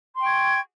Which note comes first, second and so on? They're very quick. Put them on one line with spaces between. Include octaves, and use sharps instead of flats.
C6 G5 C#6 G#6